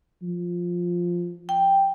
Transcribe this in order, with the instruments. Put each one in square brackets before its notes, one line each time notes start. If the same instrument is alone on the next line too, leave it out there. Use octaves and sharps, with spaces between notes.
[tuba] F3
[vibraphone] G5